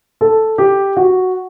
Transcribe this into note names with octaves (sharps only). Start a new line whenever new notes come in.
A4
G4
F#4